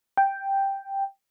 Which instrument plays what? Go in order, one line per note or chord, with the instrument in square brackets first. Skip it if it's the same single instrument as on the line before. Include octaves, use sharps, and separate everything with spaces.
[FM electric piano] G5